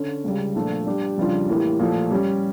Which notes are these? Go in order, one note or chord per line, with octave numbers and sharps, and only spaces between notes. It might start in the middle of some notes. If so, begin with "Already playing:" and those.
Already playing: D3 C#4
C#2 C#3 G3
A#2 F3 A3 D4
G3 D4 G4
F2 C#3 G3 D4 F4
A2 E3 A#3 E4 G4
A#2 F3 A3
G3 C#4 G4